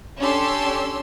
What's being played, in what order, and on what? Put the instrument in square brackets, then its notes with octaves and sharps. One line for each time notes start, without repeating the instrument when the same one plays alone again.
[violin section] C#4 D4 G4 A4 C6 E6